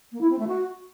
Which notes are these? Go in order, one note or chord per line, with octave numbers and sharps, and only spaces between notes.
A#3
E4
C4
A3
F#4